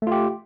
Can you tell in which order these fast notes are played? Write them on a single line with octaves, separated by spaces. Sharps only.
A3 F4 G4